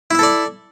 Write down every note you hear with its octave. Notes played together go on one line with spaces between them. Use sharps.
E4 A4 D5 E5